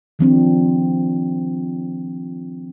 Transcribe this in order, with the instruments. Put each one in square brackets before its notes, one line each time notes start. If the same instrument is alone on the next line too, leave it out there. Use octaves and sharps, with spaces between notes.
[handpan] D#3 F3 C4 D4